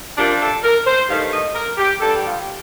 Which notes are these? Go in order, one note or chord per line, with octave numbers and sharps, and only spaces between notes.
C3 G3 D4 F4 A#4
A4
A#4
C5
G2 D#3 A3 D#4 F5
D#5
A#4
G4
G2 D3 G3 A4
G4
F4
G4